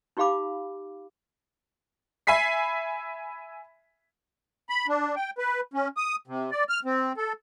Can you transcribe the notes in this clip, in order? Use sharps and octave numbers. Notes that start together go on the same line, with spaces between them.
D#4 F4 G4 F5 B5 D6
E5 G#5 B5 B6 C7
B5
D4
G5
B4
C#4
D#6
C3
D5
F6
C4
A4